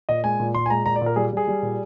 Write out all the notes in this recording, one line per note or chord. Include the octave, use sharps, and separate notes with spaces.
A#2 D#5
G#3 G#5
A#2
A#2 C6
G#5
G#3 A#5
A#2 A#5
D5
A#2
A#4
G3 G#4
G3 G#4
G3
A#2